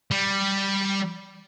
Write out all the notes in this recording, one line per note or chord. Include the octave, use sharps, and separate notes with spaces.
G3